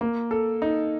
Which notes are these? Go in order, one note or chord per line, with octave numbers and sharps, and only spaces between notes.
A#3
A4
D#4